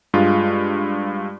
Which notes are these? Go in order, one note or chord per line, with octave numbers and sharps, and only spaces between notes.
G2 G#3 F4